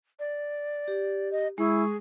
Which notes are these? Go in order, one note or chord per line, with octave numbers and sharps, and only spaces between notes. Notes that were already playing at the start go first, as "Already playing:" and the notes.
D5
G4
D#5
G#3 E4 G#4 C#6